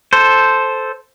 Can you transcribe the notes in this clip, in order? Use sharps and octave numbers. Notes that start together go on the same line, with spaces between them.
A4 C5